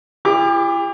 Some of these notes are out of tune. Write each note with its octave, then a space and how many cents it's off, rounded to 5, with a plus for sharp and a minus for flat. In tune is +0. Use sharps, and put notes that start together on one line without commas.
E4 +40 G4 +40 D6 +0